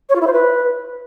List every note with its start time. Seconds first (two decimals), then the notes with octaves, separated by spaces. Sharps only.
0.09 C#5
0.15 F4
0.21 E4
0.27 C5
0.33 B4